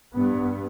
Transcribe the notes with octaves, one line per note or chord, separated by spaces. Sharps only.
G2 B3